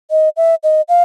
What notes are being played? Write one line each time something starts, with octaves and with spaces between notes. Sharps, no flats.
D#5
E5
D#5
F5